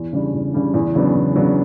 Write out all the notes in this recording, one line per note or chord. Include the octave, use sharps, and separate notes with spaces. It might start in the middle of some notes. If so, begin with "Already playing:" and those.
Already playing: E2
C#3 G3 D4
E2
C#3 G3 D4
E2
C#3 F#3 B3 D4
E2
C#3 F#3 B3 D4